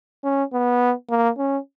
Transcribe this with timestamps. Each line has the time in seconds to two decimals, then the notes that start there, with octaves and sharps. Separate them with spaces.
0.24 C#4
0.53 B3
1.10 A#3
1.38 C#4